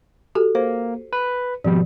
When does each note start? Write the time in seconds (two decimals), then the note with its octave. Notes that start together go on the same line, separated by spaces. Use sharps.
0.35 F#4 G4 A4
0.55 A#3 C5
1.13 B4
1.65 G#1 B2 F3 G3